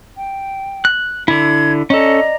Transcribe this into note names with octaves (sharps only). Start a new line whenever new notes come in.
G5
F#6
D3 E4 G#6
C#4 A4 D5 D#5 A#5